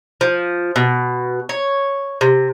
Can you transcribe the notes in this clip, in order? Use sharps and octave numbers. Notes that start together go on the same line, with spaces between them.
F3
B2
C#5
C3